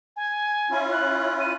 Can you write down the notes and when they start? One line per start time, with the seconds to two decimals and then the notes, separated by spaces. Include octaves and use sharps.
0.16 G#5
0.71 C#4 E4 F4
0.92 F#6
1.40 D#7